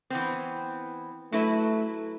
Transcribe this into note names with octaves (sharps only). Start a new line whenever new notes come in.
E3 B3 C4
F#3 A3 E4 B4